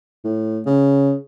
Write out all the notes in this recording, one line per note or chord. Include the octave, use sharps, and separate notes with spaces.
A2
C#3